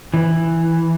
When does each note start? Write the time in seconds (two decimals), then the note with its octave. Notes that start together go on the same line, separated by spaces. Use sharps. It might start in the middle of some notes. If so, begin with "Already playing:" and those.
0.14 E3